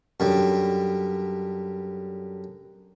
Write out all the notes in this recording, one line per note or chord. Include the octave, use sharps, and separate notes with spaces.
F#2 D3 G3